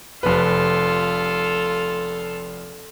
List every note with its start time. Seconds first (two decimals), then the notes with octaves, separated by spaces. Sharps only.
0.23 F1 F4 A4 B4